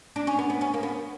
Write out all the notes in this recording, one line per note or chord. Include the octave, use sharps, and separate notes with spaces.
D4
C#4
B3
B3
C#4
A#3
B3